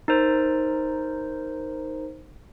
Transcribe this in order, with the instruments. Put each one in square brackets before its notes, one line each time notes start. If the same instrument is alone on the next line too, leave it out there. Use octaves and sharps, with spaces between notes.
[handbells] D#4 A#4 C5